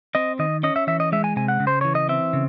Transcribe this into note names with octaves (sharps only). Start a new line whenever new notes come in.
C4 D#5
D#3 D#5
C#4 D#5
E5
E3 E5
D#5
G#3 E5
G#5
C3 G#5
F#5
C#3
C5
E3 C#5
D#5
C4 E5
C#3